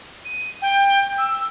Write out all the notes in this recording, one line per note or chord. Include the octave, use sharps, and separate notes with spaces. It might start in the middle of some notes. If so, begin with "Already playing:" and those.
D#7
G5
E6